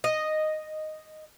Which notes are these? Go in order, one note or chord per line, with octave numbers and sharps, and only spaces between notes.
D#5